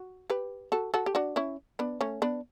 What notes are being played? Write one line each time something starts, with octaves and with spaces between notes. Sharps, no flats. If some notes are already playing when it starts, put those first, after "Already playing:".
Already playing: F#4
G4 B4
F#4 A4
F#4 A4
G4
D4 F#4
C#4 E4
B3 D4
A3 C#4
B3 D4